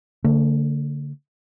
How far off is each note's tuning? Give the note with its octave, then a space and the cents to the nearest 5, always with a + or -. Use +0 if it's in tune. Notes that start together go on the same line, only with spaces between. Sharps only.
D3 -25 A3 +40